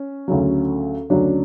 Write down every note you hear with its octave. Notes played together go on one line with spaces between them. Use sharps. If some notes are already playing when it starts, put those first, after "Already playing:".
Already playing: C#4
D2 C#3 F#3
D2 C#3 F#3 D4